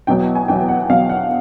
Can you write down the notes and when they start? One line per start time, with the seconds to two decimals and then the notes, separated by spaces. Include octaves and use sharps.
0.07 E2 B2 F#3 G5
0.35 G#5
0.48 E2 B2 F#3 G5
0.69 F#5
0.89 E2 B2 F#3 F5
1.09 F#5